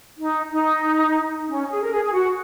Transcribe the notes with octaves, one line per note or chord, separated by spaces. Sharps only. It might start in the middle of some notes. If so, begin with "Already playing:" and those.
D#4
D#4
C#4
G#4
A#4
G#4
G#4
F#4